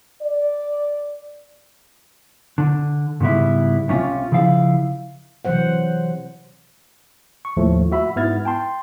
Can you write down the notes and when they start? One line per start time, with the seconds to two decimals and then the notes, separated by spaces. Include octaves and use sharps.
0.21 D5
2.58 D3
3.21 G#2 C#3 G3 B3 E4
3.88 C2 C3 C#4 F4
4.32 C#3 F3 E4 F5
5.45 C3 E3 F#3 C5 F#5
7.45 C#6
7.57 D#2 A2 F3 A3
7.92 F#4 E5 B5
8.16 G#2 B3 E4 F6 G#6 A6
8.45 G5 A5 C6